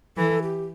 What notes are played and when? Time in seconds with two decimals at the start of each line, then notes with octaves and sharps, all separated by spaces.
0.17 E3 A4
0.43 G4